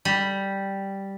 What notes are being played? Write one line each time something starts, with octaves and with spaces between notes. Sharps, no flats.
G3